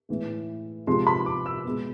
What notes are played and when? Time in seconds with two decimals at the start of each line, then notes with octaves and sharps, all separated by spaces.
0.09 A2 E3 G#3
0.87 C3 F3 G#3 C6
1.07 B5
1.26 D6
1.46 E6
1.65 B2 G#3